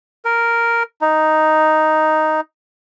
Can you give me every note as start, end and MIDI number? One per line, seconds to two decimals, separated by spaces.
0.25 0.83 70
1.02 2.40 63